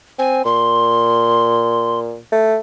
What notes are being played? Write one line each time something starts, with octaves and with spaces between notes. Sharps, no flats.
C4 G#5
A#2 C6
A3